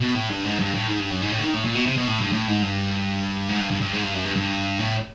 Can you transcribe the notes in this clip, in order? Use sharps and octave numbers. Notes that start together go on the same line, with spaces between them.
B2
A2
G2
G#2
G2
A2
G#2
G2
F#2
G#2
A2
D3
D#3
A2
A#2
B2
C3
B2
A2
G2
A2
G#2
G2
G#2
G2
G2
G2
G#2
G2
F#2
G2
G2
A2